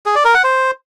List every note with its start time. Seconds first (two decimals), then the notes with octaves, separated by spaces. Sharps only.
0.06 G#4
0.15 D5
0.25 A#4
0.34 F#5
0.44 C5